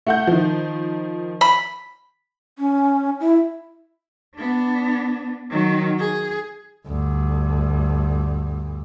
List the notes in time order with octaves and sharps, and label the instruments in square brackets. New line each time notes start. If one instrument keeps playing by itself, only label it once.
[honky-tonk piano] A3 F#5 G6
D#3 F3
[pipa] B5
[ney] C#4
E4
[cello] B3 D4
D#3 F#3
G#4
[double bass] D2 G2